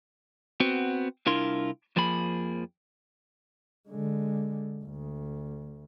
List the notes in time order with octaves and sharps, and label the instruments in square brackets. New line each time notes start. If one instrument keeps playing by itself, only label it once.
[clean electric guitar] B3 C4 F#4
C2 D4 E4 F4 A#4 C6
F2 F3 A#3 G#4 B5
[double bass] D3 G#3
D2